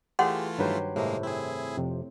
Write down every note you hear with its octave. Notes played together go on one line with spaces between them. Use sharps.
E3 A3 F4 G4 G#4 C#5 F#5 C6
G2 D#3 F#3 G4 B4 C5
A2 C3 G#3 A#3
C4 E4 G#4
F2 C3